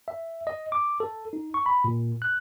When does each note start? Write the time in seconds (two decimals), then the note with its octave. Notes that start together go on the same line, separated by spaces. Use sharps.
0.08 E5
0.47 D#5
0.72 D6
1.00 A4
1.33 D#4
1.54 C#6
1.66 B5
1.84 A#2
2.22 F#6